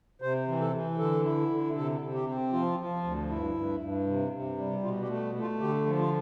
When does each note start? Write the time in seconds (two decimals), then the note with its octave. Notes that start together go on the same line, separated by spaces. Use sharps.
0.22 C3 C5
0.48 E3
0.60 A4
0.73 E3
0.98 D3 A4
1.24 E4
1.50 D3
1.76 C3 A4
2.01 C3
2.14 G4
2.27 C4
2.53 F3 F4
2.78 F3
3.04 D2
3.30 G2 E4
3.55 G2
3.80 G2
4.06 C3
4.32 C3
4.58 G3
4.83 B2 F4
5.02 G4
5.09 A3
5.35 A3
5.41 F4
5.60 D3 G4
5.86 F3
5.98 F4